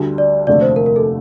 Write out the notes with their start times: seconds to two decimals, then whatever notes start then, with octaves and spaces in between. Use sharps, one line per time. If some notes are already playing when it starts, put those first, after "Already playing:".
Already playing: D2 D3 G3
0.18 D5
0.47 F1 D#2 D3 A3 D5
0.61 C5
0.76 A#4
0.86 A#4
0.96 A4